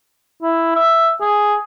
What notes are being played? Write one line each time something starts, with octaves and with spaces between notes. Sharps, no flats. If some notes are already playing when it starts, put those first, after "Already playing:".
E4
E5
G#4